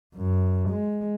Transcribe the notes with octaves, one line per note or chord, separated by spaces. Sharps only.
F#2
G#3